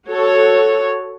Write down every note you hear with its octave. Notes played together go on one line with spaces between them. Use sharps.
F#4 A4 C#5